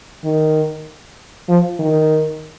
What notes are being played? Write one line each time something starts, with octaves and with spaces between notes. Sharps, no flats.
D#3
F3
D#3